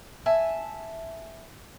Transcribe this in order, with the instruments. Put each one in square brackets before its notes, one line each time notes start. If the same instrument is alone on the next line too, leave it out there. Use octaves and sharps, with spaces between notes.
[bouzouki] E5 G#5 A5